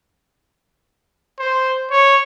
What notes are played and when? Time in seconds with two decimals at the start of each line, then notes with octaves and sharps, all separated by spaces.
1.39 C5
1.91 C#5